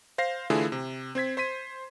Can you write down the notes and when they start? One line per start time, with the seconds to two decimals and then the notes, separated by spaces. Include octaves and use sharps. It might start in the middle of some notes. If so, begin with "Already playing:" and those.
0.18 C5 F5 A#6 C7
0.50 D3 E3 A3 E4 F4 G#4
0.72 C3
1.15 C4 C5 G#6 B6
1.37 C5 C6 B6 D#7